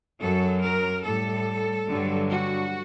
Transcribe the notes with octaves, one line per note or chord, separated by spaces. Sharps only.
F#2 F#3 A4
A#4
A2 G3 A4
G2 D3 F#3
F#4